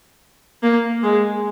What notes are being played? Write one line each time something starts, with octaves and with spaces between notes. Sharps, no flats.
A#3
G#3